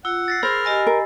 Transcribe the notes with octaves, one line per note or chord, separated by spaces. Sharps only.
F4 F#5 E6
A6 A#6 C7
G#4 A#4 C5 B5
G4 D#5 G#5
A#4